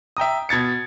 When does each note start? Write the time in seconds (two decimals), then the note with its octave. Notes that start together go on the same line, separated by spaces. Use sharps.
0.17 E5 G5 A#5 D#6
0.49 B2 G#6 A6 C#7